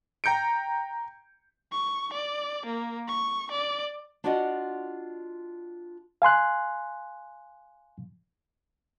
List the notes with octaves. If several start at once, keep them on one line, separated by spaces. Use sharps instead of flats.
G5 A#5 G6 C#7 D7
C#6
D5
A#3
C#6
D5
D4 F4 F#4 D5 D#5 F#5
F5 G#5 C6 F#6